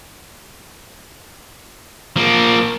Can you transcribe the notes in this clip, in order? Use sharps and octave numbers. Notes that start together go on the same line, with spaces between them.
F3 A#3